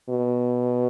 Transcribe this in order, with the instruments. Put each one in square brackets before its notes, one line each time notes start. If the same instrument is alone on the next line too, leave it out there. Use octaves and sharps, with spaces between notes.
[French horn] B2